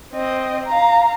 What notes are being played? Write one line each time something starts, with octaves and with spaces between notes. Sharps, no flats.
C4 D#5
F5 A#5